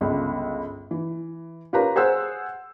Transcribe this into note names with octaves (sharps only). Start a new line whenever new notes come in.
G1 C#2
E3
F4 G4 A#4 B4 C#5 A#5
G#4 C5 F#5 E6